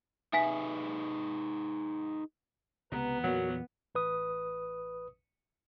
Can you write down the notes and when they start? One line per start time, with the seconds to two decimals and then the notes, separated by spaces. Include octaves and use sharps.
0.33 D#4 G#4 B4 E5 G#5 B6
2.92 C#2 C3 B3 B4 A#5
3.24 E2 A#2 F#3 A#3 F#4 A#4
3.95 A1 B4 D#6